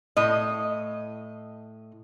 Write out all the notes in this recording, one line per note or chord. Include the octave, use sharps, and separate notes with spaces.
A2 D#5